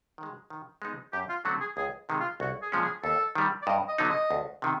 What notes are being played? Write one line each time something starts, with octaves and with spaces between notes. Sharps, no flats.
D#3 G#3
D#3
G#3 B3 D#4
F#2 G4
F4
D3 F#3 A3 C4 F#4
G#4
C#2 G#4
C3 D#3 G#3
F4
C2 F#4
G#4
A#2 F3 G#3 C#4
G#4
D#2 A4
D#3 G3
D5
G2 D#5
D#5
D3 F#3 B3 D#4
D#5
D2
C3 D#3